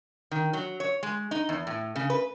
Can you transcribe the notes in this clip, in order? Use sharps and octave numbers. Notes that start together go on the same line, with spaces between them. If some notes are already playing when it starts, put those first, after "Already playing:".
D#3
F#3
C#5
G#3
D#4
E2
A2
C#3
B4